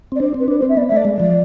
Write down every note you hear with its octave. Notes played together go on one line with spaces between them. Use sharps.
C4 D5
D4 C5
C4 B4
D4 B4
C5
C4
E5
B3 D5
E5
A3 D5
G#3
F3 D5